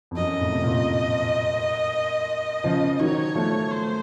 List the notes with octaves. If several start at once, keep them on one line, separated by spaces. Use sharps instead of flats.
F2
F#2 D#5
F2 A2
C3
F#2 A#2
C#3 F3
D#3 F#3 C#5
F3 A3
C5